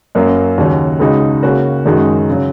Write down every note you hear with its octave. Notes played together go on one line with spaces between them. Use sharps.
F#2 F#3 A#3
D#2 C#3 F#3 C#4 F#4
C#2 C#3 G#3 D#4 F#4
C#3 A#3 C#4 F#4
F#2 D#3 G#3 D#4 F#4
C#3 F#3